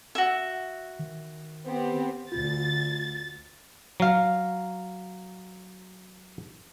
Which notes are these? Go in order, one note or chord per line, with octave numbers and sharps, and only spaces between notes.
F#4 E5
D#3
B3 C4 G4
D2 D3 F4 A6
F#3 F5